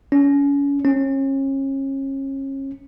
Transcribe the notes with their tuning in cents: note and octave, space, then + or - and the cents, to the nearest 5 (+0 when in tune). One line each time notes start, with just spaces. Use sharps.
C#4 +30
C#4 -35